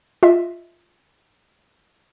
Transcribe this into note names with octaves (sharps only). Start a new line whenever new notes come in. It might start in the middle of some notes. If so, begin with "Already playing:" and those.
F4 D#5 E5